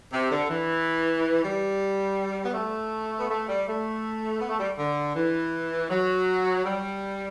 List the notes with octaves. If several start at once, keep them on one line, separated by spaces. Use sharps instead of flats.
C3
D3
E3
G3
B3
A3
B3
A3
G3
A3
B3
A3
G3
D3
E3
F#3
G3